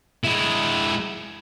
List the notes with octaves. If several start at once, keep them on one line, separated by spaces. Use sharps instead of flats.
G#3 E4